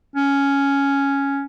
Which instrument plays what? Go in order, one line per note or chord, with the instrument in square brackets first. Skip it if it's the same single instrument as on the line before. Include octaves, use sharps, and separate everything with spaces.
[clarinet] C#4